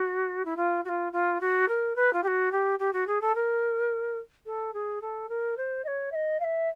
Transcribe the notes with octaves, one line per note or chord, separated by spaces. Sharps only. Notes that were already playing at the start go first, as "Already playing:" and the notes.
Already playing: F#4
E4
F4
F#4
F4
F4
F#4
A#4
B4
F4
G4
F#4
G4
G4
F#4
G#4
A4
A#4
A4
G#4
A4
A#4
C5
D#5
C#5
E5
D#5
F5
E5